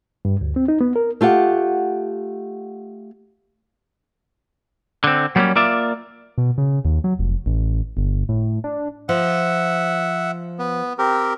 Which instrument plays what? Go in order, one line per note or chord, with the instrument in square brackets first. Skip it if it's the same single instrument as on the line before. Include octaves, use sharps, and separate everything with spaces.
[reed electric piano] G2
D2
C4
D#4
B3
A#4
[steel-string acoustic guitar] A3 F4 G4 F#5
[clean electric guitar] D3 C4
F#3 G3 A#3 C4 C#4
A#3 F4 D5 E5
[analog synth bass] B2
C#3
D#2
F#3
F1
A1
G1
A2
D4
[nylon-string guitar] F3 [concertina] E5 F#5
[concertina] B3
C4 G4 A#4